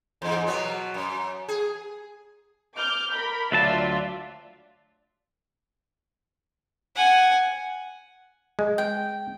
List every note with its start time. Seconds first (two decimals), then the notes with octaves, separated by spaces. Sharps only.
0.22 E2 G#2
0.47 B2 F#3 B3
0.94 F#2
1.49 G#4
2.75 D6 F6 G6
3.12 A#4 B5
3.52 D2 F#3 F4 D5 E5 A5
6.96 F#5 G#5
8.59 G#3
8.78 G5